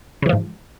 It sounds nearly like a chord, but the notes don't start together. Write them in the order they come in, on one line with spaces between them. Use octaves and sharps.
C#3 E3 F3 G#2